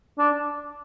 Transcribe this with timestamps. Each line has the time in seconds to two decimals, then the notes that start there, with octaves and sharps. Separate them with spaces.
0.18 D4